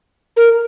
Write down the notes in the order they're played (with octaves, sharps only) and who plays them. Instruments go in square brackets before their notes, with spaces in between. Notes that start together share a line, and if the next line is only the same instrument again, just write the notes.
[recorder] A#4